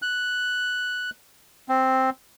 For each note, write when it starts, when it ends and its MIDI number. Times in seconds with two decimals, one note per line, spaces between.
0.02 1.10 90
1.69 2.10 60